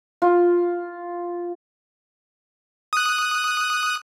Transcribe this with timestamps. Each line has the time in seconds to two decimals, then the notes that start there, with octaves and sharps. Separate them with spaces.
0.22 F4
2.93 D#6 F#6